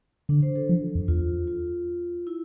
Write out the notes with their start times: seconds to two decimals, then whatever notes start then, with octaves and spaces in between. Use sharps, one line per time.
0.29 D3 D4
0.42 C5
0.56 A4
0.69 F3
0.95 F2
1.08 E2 F4
1.47 F4
2.27 E4